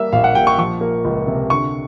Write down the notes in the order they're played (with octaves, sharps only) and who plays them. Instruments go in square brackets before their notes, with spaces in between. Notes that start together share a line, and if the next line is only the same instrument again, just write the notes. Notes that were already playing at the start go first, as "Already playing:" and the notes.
Already playing: [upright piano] G3 A#3 E5
A#1 F5
F#5
A#2 G5
C#6
F3 C#6
A#3
C#2
C3
D3 C#6